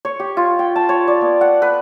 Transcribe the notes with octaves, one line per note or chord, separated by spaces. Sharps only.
C#5
G4
F4
G5
A5
C#5
D5
B3
F#5
B4